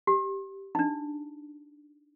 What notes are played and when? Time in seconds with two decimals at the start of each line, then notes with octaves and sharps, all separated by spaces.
0.07 G4
0.75 D4 D#4